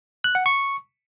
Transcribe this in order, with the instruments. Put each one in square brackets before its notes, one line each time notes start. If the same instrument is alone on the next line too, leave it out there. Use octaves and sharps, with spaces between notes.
[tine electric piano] F#6
F#5
C#6